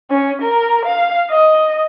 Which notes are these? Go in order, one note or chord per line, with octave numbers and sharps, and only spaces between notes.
C#4
A#4
F5
D#5